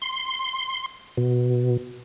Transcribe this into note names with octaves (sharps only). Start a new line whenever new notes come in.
C6
B2